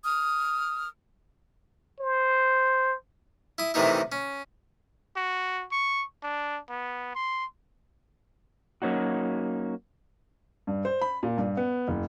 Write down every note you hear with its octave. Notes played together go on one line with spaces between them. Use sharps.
D#6 F6
C5
E4 D#6
A2 C3 D#3 E3 D#4 E4
C#4
F#4
C#6
D4
B3
C6
F#3 A#3 C#4 D#4 F#4
G2
C5
B5
A#2
G2
B3
F#1